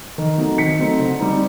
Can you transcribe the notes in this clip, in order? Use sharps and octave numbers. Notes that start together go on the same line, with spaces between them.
D#3
F#3 A3 C4 D#4
D#3 B6 C#7
F#3 A3 C4 D#4
D3
G3 C4 D#4